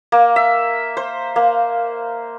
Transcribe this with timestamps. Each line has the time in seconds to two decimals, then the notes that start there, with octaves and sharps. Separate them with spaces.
0.12 A#3
0.36 E5
0.97 C5
1.36 A#3